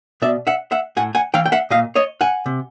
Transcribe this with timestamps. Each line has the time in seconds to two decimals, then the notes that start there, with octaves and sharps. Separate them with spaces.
0.22 B2 D5 E5
0.47 E5 F#5
0.72 E5 F#5
0.97 A2 F#5 G#5
1.15 F#5 G#5
1.34 E3 F5 G5
1.46 G5
1.52 E5 F#5
1.70 A#2 D#5 F5
1.95 C#5 D#5
2.21 F#5 G#5
2.46 C3